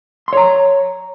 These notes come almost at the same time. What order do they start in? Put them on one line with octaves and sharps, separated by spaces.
C6 C#5 A#5